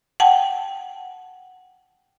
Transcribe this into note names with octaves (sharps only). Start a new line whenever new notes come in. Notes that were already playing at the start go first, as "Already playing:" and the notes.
F#5 G5 A5